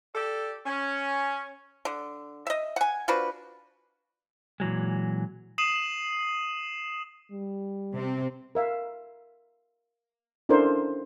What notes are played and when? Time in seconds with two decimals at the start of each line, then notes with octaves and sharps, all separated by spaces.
0.14 G4 A4 D5
0.65 C#4
1.85 D3
2.47 D#5 E5
2.76 F#5 G#5
3.08 F3 D4 F#4 B4
4.60 A#2 E3 F#3 G#3
5.58 D#6 C7 D#7 E7 F#7
7.31 G3
7.95 C3 C4
8.55 A#4 E5 F5
10.49 C#4 D4 E4 A4 A#4 C5